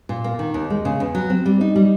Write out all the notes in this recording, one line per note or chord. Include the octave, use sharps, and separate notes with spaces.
A#2
A#3
D#3
D#2
G#3
C#3
E2
F#3
C4
G3
D#4
G3